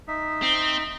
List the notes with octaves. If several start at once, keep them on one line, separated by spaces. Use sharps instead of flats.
D#4 E5
C4